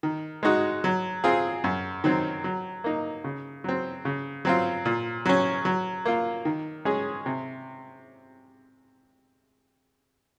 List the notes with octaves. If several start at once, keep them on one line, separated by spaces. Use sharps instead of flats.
D#3
G#3 D#4 F#4
F#3
C4 F4 G#4
F#2
D#3 F#3 C4
F#3
A#3 D#4
C#3
F#3 C4
C#3
F#3 C4 F4
A#2
F#3 C#4
F#3
A#3 F4
D#3
G#3 C#4 G#4
C3